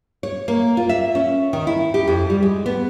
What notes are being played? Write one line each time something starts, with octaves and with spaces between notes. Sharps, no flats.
C#5
A#3
F4
E5
C#4
D#3
E4
G4
F2
G3
G#3
B3